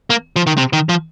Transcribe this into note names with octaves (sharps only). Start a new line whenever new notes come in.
A#3
F3
D#3
C3
D#3
F3